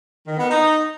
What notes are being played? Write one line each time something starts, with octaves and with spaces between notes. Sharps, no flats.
D#3
B3
D#4